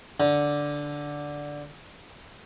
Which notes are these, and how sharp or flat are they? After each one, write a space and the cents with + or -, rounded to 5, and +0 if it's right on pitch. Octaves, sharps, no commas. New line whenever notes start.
D3 -5